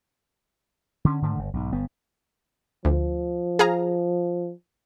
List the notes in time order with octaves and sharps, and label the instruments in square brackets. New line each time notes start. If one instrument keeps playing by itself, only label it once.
[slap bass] D3 C#4
G#2 D3 D#3 A3
G1
B1 G#2
G1 B3
[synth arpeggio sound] D2 [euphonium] F3
[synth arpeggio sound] G#4 F5 A#5